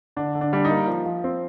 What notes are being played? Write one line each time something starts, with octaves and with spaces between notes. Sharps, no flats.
D3 D4
D3
D4
G3 D4
D#4
A#3
F3
F3
C4